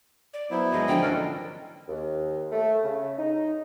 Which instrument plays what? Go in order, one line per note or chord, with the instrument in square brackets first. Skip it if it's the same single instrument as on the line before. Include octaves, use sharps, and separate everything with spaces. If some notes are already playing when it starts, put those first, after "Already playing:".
[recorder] D5
[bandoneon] F#3 B3 E4 [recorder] C5
[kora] E3 G#3 A3 [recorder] D#5
[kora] D3 E3 F3 [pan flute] G5
[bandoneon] F#3 C#4 D4 [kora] A#3 A4 A#4
[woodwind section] D#2
A3
C#3
D#4